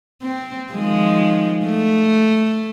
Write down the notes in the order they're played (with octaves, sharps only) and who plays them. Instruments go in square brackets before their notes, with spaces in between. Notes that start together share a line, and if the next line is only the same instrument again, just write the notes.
[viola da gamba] C4
D#3 F3 G#3
A3